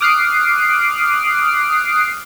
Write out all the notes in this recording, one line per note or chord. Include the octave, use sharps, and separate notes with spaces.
D6 D#6 F6 F#6 C7 D7